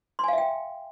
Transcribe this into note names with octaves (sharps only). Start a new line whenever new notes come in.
E5 F5 G5 G#5 C6